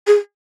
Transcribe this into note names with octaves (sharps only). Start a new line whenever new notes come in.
G#4